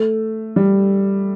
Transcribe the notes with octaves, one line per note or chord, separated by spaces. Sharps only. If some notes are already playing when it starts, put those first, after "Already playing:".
Already playing: A3
G3